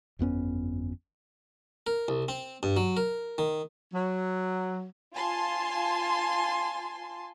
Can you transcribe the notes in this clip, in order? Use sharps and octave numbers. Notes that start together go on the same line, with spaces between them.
G1 F2 B3 C#4
A#4
C2
C4
G2
F#3
A#4
D#3
F#3
F4 G#5 A5 C6